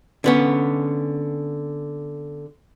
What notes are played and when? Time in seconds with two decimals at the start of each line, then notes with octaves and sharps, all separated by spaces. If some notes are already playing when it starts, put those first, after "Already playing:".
0.24 D3 B3 C#4